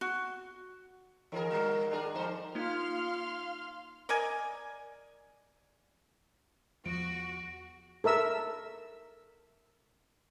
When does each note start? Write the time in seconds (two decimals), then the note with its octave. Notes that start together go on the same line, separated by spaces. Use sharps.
0.01 F#4
1.32 D#3 E3 G#4 A#4
1.51 G3 A#3 F#4 A#4 D5
1.91 D#3 D4 G#4 A#4
2.15 F2 G#2 C5
2.55 A#3 D#4 F4 F5 C6 F6
4.09 A#4 D5 D#5 G#5
6.86 E2 F3 F#4 D7
8.04 A4 A#4 E5 E6